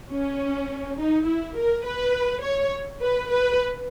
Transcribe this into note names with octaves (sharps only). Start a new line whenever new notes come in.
C#4
D#4
E4
A#4
B4
C#5
B4
B4